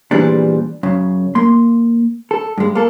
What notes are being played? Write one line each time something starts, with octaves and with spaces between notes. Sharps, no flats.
E2 A#2 E3 F3 G3 D4
F#2 C#3
A#3 C6
A4
G2 G#3
A#3 A4